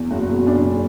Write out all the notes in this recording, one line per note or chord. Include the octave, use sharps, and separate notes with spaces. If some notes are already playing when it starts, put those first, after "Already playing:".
Already playing: E2
F#1 F#4
B2
F#1 D4